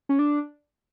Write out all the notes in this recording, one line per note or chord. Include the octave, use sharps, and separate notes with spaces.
C#4
D4